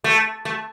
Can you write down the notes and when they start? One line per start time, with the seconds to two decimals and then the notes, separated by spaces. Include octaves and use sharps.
0.04 A3
0.45 A3